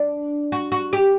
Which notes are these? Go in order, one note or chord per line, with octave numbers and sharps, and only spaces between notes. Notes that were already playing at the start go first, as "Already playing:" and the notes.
Already playing: D4
F#4
F#4
G4